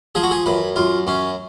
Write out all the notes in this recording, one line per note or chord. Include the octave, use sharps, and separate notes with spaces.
F3 G#4
F#4
G#4
F#2 B4
F#2 F4
F#2 C#4